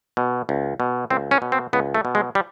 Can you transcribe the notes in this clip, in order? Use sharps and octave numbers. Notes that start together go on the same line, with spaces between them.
B2
C#2
B2
C#2 C4
C#4
B2
C4
C#2 B3
A3
B2
G#3
G3